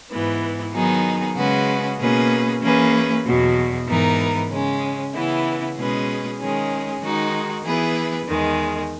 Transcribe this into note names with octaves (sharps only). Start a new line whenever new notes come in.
G#2 E3 B3
D#3 F#3 B3 D#4 G#4
C#3 G#3 C#4 F#4 B4
B2 A#3 C#4 G#4 B4
E3 A#3 C#4 G#4 B4
E2 B2 F#3
G#2 E3 B3 D#4 A#4
C#3 G#3 C#4
C#3 E3 B3 E4
B2 G#3 C#4 G#4 B4
D#3 G#3 C#4 G#4
D#3 G#3 D#4 F#4
E3 B3 E4 G#4 B4
E2 D#3 G#3